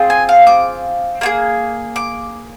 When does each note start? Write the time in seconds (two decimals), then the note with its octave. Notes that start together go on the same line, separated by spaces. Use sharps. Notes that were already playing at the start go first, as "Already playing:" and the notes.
Already playing: C4 F4 G#4
0.10 G#5
0.29 F5
0.47 D6
1.21 A#3 F4 G#4
1.96 D6